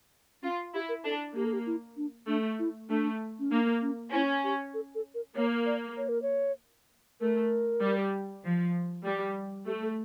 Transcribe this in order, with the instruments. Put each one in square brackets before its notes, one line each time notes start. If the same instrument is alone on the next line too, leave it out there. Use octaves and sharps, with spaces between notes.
[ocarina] C#4 [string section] F4
[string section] E4 [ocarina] G4
[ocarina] A#4
[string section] D4 [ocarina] A4
[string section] A#3 [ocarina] G4
[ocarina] A4
G4
E4
D4
[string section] A3 [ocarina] D4
[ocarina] E4
[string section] A3 [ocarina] D4
[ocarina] C#4
[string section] A#3 [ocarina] D4
[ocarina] C#4
[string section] C#4 [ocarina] E4
[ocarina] G4
A4
A4
A#4
[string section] A#3 [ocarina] C#5
[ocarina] D5
C#5
A#4
C#5
[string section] A3 [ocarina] A#4
[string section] G3
F3
G3
[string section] A3 [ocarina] G4
[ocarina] A4